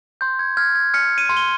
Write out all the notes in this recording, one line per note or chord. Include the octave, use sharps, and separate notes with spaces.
C6 G6
G#6
F6 G#6
G#6
F6 C#7
D#7
C6
G7